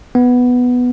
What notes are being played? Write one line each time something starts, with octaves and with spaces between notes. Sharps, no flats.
B3